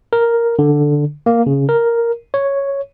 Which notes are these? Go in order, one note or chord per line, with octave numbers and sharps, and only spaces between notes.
A#4
D3
A#3
C#3
A#4
C#5